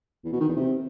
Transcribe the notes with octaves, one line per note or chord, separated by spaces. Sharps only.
E2
B2
D#3
E2
C3